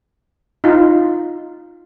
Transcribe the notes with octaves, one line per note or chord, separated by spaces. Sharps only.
D#4 F4